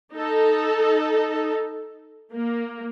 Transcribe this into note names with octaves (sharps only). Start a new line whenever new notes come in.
D#4 A4
A#3